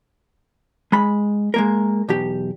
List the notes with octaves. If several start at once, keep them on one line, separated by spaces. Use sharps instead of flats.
G#3 B5
G#3 A#3 A#4
B1 E2 G4